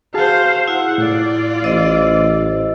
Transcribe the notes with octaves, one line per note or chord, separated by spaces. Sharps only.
F#4 G#4 C5 F5 A5
E4 F#5
A2 F4 D5
A1 C5 D#5 E6